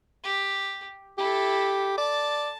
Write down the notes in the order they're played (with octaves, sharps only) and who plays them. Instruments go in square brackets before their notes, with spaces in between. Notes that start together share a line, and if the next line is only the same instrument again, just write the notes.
[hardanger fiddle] G4
[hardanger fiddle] E4 A4 [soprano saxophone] G4
[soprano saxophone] D5 [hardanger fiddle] A5